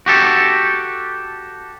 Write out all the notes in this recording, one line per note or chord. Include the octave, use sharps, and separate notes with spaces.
F#4 G4 A4